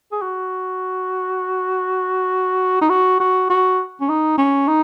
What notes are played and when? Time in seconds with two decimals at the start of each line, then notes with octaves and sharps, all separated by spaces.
0.12 G#4
0.22 F#4
2.81 D#4
2.90 F#4
3.20 F#4
3.50 F#4
4.01 C#4
4.09 D#4
4.38 C#4
4.68 D#4